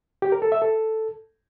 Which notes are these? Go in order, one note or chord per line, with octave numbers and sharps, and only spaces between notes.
G4
A#4
A4
E5
A4